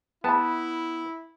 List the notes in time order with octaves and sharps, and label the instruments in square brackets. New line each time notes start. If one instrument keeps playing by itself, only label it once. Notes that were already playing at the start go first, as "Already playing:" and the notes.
[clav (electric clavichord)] B3 [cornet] E4 [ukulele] A5 B5